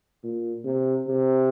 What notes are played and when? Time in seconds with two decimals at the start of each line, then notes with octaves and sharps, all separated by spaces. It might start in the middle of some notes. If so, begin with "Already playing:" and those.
0.24 A#2
0.65 C3
1.08 C3